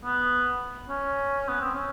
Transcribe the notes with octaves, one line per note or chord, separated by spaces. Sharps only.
B3
C#4
B3
C4
C#4